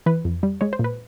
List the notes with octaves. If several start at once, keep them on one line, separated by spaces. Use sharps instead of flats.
E3 B4
F2
G3
G#3 C#5
C5
A#2
B4